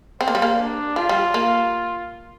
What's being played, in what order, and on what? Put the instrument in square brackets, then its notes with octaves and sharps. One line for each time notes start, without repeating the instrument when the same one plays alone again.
[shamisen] C4 [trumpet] C5
[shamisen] A#3
G3
A#3
[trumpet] D4
[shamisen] F3 [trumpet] F4
[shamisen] G3
A#3